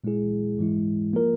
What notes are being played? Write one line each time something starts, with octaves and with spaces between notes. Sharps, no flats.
A#2 G#3 E4 G#4
G#2 E3 G#3 E4
F3 A#3 F4 A#4